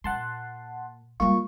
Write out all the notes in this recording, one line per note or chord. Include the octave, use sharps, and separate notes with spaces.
A#2 F#5 A5 C6
G3 G#3 A#3 F4 C#6